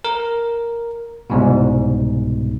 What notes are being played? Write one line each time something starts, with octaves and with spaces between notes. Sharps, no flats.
A#4
C2 G#2 B2